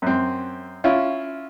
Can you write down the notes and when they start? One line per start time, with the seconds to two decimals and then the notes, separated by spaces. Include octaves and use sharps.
0.02 F#2 C4
0.84 C#4 E4 F4